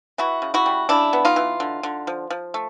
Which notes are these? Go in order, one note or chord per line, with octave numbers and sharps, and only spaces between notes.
E3 E4 F#4
C#3
E4 F#4
G3
C#3 D4 E4
B3
D#4 F4
E3
D3
D3
F3
F3
A3